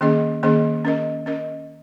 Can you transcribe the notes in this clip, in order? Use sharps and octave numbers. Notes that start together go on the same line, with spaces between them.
D#3 A#3 C#4 G#4 D#5
D#3 A#3 C#4 G#4 D#5
C#4 A#4 D#5
C#4 A#4 D#5